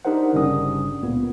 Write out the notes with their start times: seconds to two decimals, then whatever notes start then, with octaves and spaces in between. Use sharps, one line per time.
0.05 D4 D#4 G4 A#4 C5 F#5
0.33 G1 G2 C#3 G3 C#4 D#6
1.03 C#2 A#2 B3